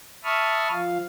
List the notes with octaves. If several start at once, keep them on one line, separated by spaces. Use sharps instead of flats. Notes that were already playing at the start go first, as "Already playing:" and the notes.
E5 A5 B5 C#6 D#6 F6
F3 F5